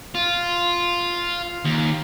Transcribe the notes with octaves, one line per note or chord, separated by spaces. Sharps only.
F4
D#2